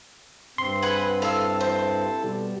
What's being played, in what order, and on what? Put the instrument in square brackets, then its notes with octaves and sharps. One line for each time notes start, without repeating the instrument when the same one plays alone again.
[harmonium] G2 C4 [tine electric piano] C6
[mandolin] G#4 B4 F#5
[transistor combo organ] E4 A4 A5 [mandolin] F5 E6
[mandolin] C5
[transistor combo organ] B2 G3